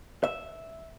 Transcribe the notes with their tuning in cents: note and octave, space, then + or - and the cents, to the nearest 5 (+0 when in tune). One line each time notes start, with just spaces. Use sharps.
E5 -5